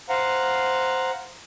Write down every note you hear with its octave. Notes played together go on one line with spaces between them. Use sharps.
C5 F5 F#5 A#5